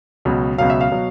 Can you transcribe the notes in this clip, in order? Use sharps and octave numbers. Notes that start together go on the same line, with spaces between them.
C#2 B2 F#3
C#2 B2 F#3 F5
E5
F5
B2 F#3